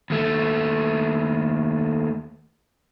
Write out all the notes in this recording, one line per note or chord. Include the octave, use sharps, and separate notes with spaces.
D#2 A3